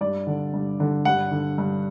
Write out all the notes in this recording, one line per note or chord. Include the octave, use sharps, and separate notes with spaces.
G2 D5
D3
G2
D3
G2 F#5
D3
G2